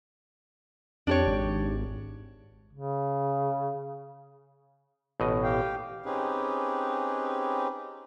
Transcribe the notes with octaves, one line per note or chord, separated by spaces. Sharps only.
F2 D4 G4 C#5
G#1
C#3
A1 B2 D#5
G4 F5 G5
C4 C#4 D#4 G4 G#4 B4